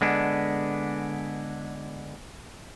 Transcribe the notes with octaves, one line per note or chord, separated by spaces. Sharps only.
D3 G#3 B3 D4